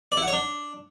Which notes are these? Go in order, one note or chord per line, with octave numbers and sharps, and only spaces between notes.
D5
E4
F#5
C#5
D4